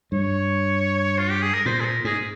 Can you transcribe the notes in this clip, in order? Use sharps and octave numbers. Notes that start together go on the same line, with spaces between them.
G2 C#5
F4
G4
G#4
A#4
A#2 C5
G#4
A#4
G#2 G#4